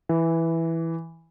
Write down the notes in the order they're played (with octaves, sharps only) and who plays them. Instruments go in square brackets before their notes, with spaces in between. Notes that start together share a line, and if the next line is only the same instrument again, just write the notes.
[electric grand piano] E3